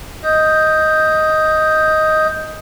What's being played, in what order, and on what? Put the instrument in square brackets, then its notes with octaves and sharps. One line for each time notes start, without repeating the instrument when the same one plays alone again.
[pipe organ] D#5 D#6 G6